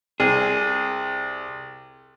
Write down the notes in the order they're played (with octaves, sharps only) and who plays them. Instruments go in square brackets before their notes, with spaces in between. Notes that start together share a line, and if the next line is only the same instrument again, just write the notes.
[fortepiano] C2 [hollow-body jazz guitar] G#4